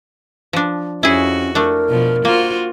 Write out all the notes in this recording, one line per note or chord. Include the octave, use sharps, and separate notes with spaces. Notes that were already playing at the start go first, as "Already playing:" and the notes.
F3 D4
F2 C#4 E4 F#4 G#4
A3 D4 A#4
B2 F3
A#3 F4 F#4 C5